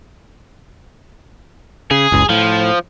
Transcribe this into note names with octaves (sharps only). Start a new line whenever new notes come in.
C#3 G#4
F#1 C#2
A2 F3